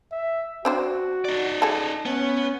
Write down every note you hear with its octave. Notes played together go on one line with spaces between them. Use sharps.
E5
C4 D4 F#4 C5
D#4 D5
G#4 A4
B3 C#4